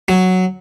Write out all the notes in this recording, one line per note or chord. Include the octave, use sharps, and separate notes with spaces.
F#3